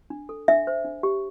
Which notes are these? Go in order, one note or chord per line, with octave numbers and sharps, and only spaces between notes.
D4
A4
D4 E5
C5
D4
G4